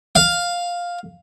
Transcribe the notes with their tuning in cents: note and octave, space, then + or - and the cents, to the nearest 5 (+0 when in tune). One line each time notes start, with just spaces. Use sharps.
F5 +5